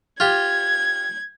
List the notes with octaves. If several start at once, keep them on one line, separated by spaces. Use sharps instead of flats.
F4 G4 G#6